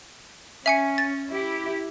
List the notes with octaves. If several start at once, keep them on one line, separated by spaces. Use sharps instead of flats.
C#4 E5 G#5 C#7
A6
E4 G4